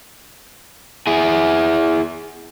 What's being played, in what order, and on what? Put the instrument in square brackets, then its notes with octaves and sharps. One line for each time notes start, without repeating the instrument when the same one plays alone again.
[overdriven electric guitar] E4 G#4